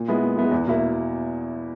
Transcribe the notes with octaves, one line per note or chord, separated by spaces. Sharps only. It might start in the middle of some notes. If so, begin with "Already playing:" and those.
Already playing: A#2
G#3 B3 E4
A#2
G#3 B3 E4
E2
B2 A#3 E4